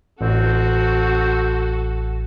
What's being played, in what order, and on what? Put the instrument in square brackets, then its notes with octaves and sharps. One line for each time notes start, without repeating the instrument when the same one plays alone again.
[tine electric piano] A1 [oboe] C4 [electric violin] F#4 A4